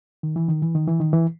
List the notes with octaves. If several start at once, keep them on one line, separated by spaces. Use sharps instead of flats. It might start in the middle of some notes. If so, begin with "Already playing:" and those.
D#3
E3
D#3
E3
D#3
E3
D#3
E3